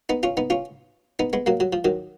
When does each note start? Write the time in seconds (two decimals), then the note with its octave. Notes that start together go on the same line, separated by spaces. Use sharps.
0.09 B3 D#4
0.23 C#4 F4
0.37 B3 D#4
0.50 C#4 F4
1.19 B3 D#4
1.33 G#3 B3
1.46 F#3 A#3
1.60 F#3
1.73 F3
1.85 D#3 F#3